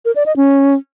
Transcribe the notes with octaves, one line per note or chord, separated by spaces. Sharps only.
A#4
D5
D#5
C#4